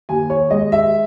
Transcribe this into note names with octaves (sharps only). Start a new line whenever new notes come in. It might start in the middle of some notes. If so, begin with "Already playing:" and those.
D#2 G#5
C#5
G#3 D#5
E5